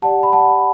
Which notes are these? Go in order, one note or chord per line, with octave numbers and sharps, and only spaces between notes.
G4 D5 F#5 A5
B5
F#5 A5